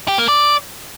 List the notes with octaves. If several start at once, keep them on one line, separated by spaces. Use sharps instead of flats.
G4
A#3
D5